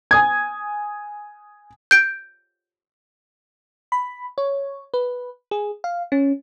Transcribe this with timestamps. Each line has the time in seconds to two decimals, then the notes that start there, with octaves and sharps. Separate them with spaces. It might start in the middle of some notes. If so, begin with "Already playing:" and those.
0.11 G#5 D#6 G#6
1.91 G6 D7
3.92 B5
4.38 C#5
4.94 B4
5.51 G#4
5.84 F5
6.12 C#4